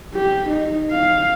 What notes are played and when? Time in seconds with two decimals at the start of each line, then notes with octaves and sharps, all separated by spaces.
0.15 G4
0.50 D#4
0.92 F5